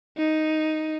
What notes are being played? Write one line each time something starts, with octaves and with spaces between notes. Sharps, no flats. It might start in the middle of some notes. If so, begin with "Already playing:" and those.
D#4